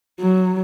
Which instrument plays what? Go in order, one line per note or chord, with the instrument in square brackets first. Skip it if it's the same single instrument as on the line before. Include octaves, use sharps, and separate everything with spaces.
[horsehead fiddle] F#3